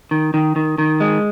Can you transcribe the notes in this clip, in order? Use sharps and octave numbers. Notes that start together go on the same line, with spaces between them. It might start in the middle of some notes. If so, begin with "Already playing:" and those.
D#3
D#3
D#3
D#3
G#3